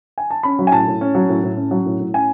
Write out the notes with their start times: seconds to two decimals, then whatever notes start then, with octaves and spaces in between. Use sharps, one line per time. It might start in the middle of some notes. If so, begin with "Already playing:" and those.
0.18 G#5
0.30 A5
0.43 C#4 B5
0.59 F#3
0.67 G#5
0.72 A2 A5
0.87 A2
1.01 C#4
1.15 F#3
1.29 A2
1.43 A2
1.57 C#4
1.71 F#3
1.86 A2
2.00 A2
2.14 C#4 G#5